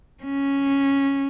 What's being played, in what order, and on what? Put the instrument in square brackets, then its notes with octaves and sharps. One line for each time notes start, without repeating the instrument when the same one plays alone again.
[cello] C#4